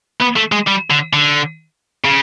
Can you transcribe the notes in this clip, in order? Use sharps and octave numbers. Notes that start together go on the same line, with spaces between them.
B3
A3
G#3
G3
D3
D3
C#3